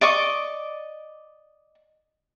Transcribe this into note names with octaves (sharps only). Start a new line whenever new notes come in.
D5 D#5 C#6 D6